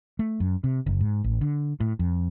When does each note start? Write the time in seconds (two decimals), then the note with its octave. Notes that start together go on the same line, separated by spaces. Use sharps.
0.19 A3
0.40 F#2
0.64 C3
0.86 F#1
1.01 G#2
1.24 A1
1.41 D3
1.80 A2
1.99 F2